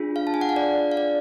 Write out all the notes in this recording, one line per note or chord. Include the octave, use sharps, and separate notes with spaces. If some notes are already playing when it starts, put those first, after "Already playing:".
Already playing: D4 F4 G#4
F5
A5
G#5
F#5
F5
D5
F5
D5